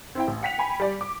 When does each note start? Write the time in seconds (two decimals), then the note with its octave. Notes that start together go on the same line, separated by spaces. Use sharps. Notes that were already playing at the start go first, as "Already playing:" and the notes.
0.15 C4 E4 G5
0.27 A1
0.43 F#5 G5 B6 C#7 F7
0.58 G5 G#5 B5
0.80 G3 D5
1.01 D6